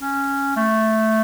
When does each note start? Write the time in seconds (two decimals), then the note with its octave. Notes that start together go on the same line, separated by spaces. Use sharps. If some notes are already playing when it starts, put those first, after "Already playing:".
0.01 C#4
0.56 A3